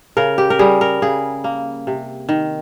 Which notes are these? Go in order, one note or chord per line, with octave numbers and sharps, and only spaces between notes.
C#3 A#4
G4
A#4
G3 G#4
A#4
C#3 G#4
A#3
C3
D#3